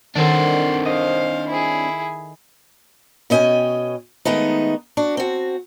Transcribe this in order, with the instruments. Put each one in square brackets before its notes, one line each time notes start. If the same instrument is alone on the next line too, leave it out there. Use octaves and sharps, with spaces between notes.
[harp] D#3 A4 [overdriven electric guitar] C4 D4 [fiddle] F#5 C6
[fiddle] C5 F5 [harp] D#5
[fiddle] E4 G#4
[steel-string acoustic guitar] B2 C#4 D#5 G5 G#5
D#3 G#3 A3 B3 D#4
D4 F#4
C4 F#4